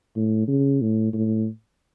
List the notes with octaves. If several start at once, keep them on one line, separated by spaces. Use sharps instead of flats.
A2
C#3
A2
A2